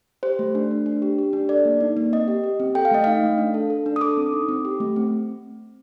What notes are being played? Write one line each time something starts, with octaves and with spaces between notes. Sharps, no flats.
G4 C5
A3
D4
A3
D4
G4
G4
D4
A4 D5
A#3
D#4
A#3
C4 D#5
G4
G4
C4
A4 G5
F5
A3 D#5
D#4 F5
A3
D4
A4
A4
D4
D#6
A4 D6
C4
D#4
C4
G4
A3
C4